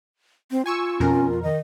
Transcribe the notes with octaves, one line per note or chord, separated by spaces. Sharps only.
C4
F4 G#5 C#6 E6
F2 B2 C#4 A#4
D#3 D#5